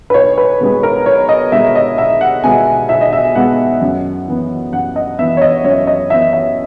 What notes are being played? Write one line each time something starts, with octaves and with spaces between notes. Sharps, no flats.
B4
B1 C#5
B4
B2 G#3 B3
A#4
B1 C#5
D#5
B2 G#3 B3 E5
D#5
B1 E5
F#5
B2 G#3 B3 G#5
B1 E5
D#5
E5
B2 G#3 B3 F#5
F#2
E3 B3
F#2 F#5
D#5
E3 B3 E5
C#5
D#5
F#2 C#5
D#5
E3 B3 E5
E5